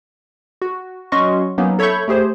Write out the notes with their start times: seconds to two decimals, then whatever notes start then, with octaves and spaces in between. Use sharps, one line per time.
0.62 F#4
1.12 F#3 C#4 F#4 D#5 C6 C#6
1.58 F#3 A#3 B3 C#4 D#4
1.79 A4 C#5 E5 B5 C#6 G6
2.08 A3 G4 G#4 C5